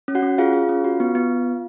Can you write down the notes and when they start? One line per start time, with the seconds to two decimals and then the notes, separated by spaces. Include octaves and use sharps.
0.08 C#4
0.15 F#4 F#5
0.23 C#4
0.38 F4 G#4 F5
0.53 G#4
0.69 C#4
0.84 F#4
1.00 B3
1.15 B3